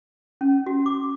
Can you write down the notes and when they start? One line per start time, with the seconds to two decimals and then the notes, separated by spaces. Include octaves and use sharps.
0.41 C#4
0.66 F#4
0.86 D6